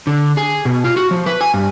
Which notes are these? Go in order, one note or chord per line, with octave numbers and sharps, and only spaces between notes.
D3
G#4
B2
F4
F#4
F3
B4
G#5
G2